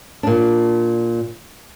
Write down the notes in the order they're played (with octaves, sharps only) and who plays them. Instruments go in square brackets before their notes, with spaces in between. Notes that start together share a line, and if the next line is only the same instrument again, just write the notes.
[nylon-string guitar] A#2 D4